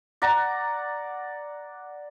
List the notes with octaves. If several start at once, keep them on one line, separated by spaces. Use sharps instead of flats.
D5 F#5 A#5